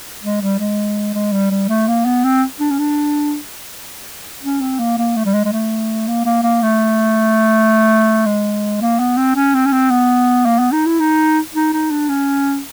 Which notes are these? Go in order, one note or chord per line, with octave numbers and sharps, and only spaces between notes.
G#3
G3
G#3
G#3
G3
G3
A3
A#3
B3
C4
D4
C#4
D4
C#4
C4
A#3
A#3
A3
G3
G#3
G#3
A3
A#3
A#3
A#3
A3
G#3
A#3
B3
C4
C#4
C4
C#4
C4
B3
A#3
B3
D#4
E4
D#4
D#4
D#4
D4
C#4